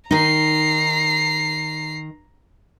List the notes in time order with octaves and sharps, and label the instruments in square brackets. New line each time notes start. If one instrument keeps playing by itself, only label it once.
[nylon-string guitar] D#3 D#4 [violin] A#5 C7